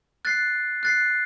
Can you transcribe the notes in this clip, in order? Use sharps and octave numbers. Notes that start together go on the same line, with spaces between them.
F#6 A6 C7
F#6 A6 C7